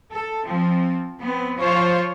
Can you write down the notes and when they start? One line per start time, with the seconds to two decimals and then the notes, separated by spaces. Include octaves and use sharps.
0.12 A4
0.46 F3 C4
1.20 B3 C4
1.59 F3 F4 C5 C#5